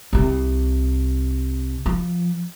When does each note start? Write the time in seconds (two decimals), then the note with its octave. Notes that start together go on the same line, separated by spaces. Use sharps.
0.13 C2 C3
1.86 F3